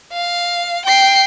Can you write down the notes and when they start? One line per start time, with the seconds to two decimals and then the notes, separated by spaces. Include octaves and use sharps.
0.13 F5
0.85 G5 C7